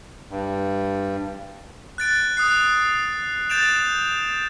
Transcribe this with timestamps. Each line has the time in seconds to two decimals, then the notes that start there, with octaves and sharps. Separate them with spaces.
0.30 G2
1.98 F#6 A6 D7
2.37 D#6 F#6 C7
3.49 G6 A6 D7 E7 F7